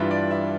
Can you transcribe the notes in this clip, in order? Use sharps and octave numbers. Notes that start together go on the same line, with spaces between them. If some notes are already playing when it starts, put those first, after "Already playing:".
Already playing: G2 E3 G3 D4 F4 E5
D5
E5